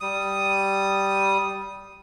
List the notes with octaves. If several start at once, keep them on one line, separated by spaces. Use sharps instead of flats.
G3 D#6